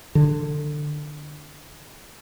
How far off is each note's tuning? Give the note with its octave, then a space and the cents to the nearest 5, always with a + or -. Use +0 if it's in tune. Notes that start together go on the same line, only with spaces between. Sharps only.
D3 +20